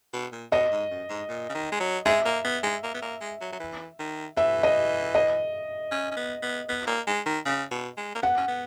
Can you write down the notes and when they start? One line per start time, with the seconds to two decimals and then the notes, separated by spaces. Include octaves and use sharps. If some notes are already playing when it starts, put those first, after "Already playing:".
0.13 B2
0.32 A#2
0.52 B2 D#5
0.71 G#2
0.91 F#2
1.10 G#2
1.29 A#2
1.49 C#3
1.54 D#3
1.72 G#3
1.80 F#3
2.06 G#3 E5
2.26 A#3
2.45 B3
2.63 G#3
2.83 A#3
2.94 B3
3.02 A#3
3.21 G#3
3.41 F#3
3.53 F#3
3.60 E3
3.99 D#3
4.37 E3 E5
4.63 D#5
5.15 D#5
5.91 C#4
6.11 C#4
6.17 B3
6.42 B3
6.69 B3
6.87 A#3
7.07 G#3
7.26 D#3
7.46 C#3
7.71 B2
7.98 G#3
8.15 A#3
8.22 B3 F#5
8.37 C#4
8.48 B3